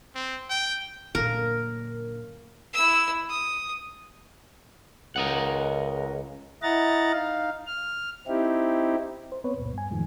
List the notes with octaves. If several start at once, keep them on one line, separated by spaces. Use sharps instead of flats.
C4
G5
F#2 A#2 D3 A#3 A4 A#4
E4 E6
D#6
C#2 A#4 D#5 F#5
E4 D#5 F#5 A#5 A6
D#4 F5
F6
C4 D#4 E4 G4
C5
B3 C4 B4 C#5
C#2 F#2 A#2
G2 G#5
F2 A2 D#3 F3 G#3